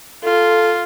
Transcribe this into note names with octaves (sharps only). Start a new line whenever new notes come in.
F4 A4